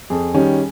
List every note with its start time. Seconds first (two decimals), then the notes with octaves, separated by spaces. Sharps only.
0.10 F2 G#4
0.34 D#3 G3 C#4